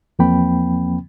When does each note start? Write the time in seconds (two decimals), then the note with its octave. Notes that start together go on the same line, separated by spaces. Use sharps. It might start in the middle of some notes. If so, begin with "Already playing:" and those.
0.19 E2 F3 A#3 C4 G5 B5